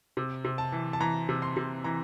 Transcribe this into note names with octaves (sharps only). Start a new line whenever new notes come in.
C3
C3
A5
E3
A5
E3 A#5
C3
C6
C3
E3 A#5